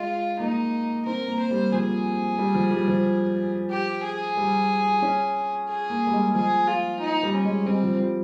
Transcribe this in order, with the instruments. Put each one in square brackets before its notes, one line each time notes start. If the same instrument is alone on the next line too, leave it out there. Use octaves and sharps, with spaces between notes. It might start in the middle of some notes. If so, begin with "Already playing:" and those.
Already playing: [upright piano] G#3 [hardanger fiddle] F4
[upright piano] A#3 [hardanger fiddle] D#4
[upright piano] C4 [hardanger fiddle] A#4
[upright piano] A#3
[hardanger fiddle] C5
[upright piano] G3
[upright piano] F3 [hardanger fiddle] G#4
[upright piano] G3
F3
G3
F3
[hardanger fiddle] G4
G#4
[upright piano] G3
C#4
[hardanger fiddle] G#4
[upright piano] A#3
G3
G#3
[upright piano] F3 [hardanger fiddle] G#4
[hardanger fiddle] F4
D#4
[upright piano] G3
[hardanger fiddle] C#4
[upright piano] G#3
[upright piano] G3 [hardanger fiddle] C4
[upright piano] F3
G3